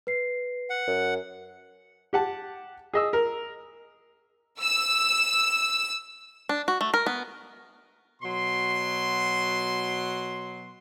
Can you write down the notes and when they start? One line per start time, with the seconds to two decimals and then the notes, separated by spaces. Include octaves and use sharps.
0.07 B4 C7
0.70 F#5
0.87 F#2
2.13 G4 F#5 A5
2.94 G#4 D#5 E6
3.13 A#4
4.61 E6
6.49 D4
6.68 F#4
6.81 A3
6.94 A#4
7.06 B3
8.22 B2 F#3 C6